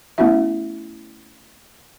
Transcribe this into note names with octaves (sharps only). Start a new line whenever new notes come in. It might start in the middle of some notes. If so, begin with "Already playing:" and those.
A3 B3 C#4 E4 F#4 E5